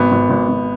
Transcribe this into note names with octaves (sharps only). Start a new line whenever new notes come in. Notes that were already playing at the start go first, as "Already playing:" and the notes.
Already playing: G#1 B3
G#1
G#1
G#1